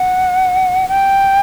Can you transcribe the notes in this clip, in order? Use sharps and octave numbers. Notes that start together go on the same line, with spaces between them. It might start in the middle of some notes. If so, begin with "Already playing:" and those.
Already playing: F#5
G5